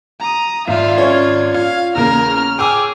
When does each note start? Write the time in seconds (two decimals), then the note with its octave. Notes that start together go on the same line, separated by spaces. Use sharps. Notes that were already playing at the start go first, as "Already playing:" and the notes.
0.20 A#5 D#6
0.68 G#1 F4 D5 E5 F5
0.98 C#4 C#5 G#6
1.54 F4 F5
1.95 E2 C#3 A#3 A#4 F6
2.59 G#4 G5 D6 E6